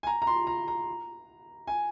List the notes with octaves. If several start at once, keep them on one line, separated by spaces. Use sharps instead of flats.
G#5
A#5
A#5
C6
A#5
A#5
G#5